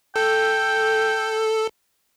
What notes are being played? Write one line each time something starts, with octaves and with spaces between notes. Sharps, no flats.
A4 G5